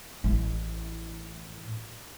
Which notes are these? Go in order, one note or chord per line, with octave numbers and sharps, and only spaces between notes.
A1 A2